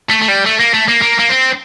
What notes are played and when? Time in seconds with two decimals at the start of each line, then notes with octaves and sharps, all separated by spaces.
0.10 A3
0.22 A3
0.28 G3
0.46 A3
0.60 A#3
0.74 A3
0.88 A#3
1.01 A#3
1.19 A#3
1.29 C4